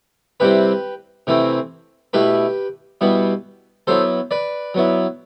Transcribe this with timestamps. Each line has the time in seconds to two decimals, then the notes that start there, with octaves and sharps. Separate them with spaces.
0.40 C3 G3 C4 E4 G4 B4
1.27 C3 E3 A3 C4 E4
2.13 B2 A3 E4 G4 B4
3.01 B2 G3 B3 E4
3.87 F#3 B3 E4 A4 C5
4.31 B4 D5
4.74 F#3 B3 E4